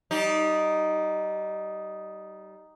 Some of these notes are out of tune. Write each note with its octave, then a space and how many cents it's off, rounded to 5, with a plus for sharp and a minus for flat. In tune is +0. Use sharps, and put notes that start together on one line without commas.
G3 -20 D#4 +0